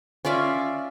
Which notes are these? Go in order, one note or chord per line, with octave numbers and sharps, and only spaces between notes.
C#4 F4 D5 E5